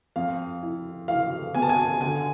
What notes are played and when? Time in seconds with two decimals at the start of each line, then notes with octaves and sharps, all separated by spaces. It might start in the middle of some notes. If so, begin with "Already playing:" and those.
0.16 F2 F5
0.62 E4
1.08 E3 F5
1.55 B3 G#5
1.62 A5
1.69 G#5
2.01 D3 G#5